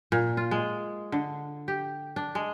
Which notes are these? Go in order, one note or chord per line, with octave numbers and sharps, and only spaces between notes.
A#2
F4
G#3
D3
G4
D4
G#3